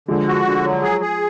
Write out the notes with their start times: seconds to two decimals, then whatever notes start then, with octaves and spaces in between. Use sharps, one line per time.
0.08 D3 F3 G#3
0.27 F#4
0.46 D3
0.64 F#3
0.82 G#4
1.01 G#4